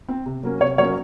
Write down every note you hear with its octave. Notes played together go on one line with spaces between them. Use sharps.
C4
C3
F#3 A#3 C#4
C3 C#5
F#3 A#3 C#4 C#5